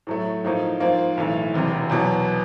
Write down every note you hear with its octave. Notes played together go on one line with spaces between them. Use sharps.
A2 F#3 A3
A2 F3 A#3 D#4
G#2 F3 A#3
B1 A2 E3 A3
E1 E2 C3
E2 B2 F#3 B3